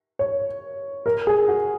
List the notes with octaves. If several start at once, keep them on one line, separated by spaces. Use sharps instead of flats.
C#5
A#4
G#4
F#4